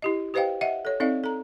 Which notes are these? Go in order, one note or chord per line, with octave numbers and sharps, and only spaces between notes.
E4 G4 D#5
G4 B4 C5 D#5 F5 G5
D#5 E5 F#5
A4 C#5
C4 D#4 A4 D5 D#5 F5
A4 A#5